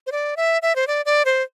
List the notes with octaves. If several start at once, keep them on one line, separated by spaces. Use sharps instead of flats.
C5
D5
E5
E5
C5
D5
D5
C5